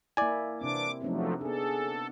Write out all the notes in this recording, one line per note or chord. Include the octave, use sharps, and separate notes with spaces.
A#3 E4 D5 G#5
C3 E3 C4 D4 D6
E2 F3 F#3 A3 C4 D4 D#4
B3 D4 G#4 A4